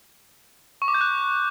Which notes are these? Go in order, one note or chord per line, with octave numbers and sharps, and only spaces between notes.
C#6
D6
G6
F#6